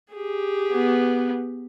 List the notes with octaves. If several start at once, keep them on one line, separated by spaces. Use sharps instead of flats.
G4 G#4
B3